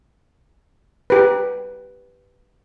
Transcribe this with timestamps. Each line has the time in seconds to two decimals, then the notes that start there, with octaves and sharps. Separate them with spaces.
1.10 G4 B4